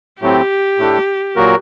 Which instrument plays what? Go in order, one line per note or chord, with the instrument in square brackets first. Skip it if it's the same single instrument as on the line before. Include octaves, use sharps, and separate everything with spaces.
[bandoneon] A2 F#3 A3 C4 [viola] G4
[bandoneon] A2 A3 D4 A4
A#2 F#3 A#3 F#4 A#4